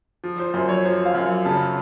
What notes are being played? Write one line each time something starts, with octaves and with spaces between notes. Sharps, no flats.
F3
C5
F#2 C5
C#5
F3 C5
F5
F#2
C#3 A5